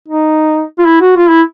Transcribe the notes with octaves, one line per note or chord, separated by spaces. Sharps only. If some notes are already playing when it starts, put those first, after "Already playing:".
D#4
F4
E4
F#4
F4
E4